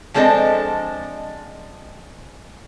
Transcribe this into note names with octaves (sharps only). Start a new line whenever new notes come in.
F3 G#3 C4 D4 A4 D#5